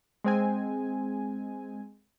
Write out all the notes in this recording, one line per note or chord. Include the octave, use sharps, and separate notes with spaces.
G#3 C4 G#5